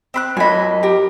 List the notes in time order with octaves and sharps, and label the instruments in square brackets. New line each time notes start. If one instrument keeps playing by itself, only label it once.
[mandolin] C4 B5 F#6
[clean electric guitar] F#2 D#5 [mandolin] G#5 B5
[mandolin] G4 A#4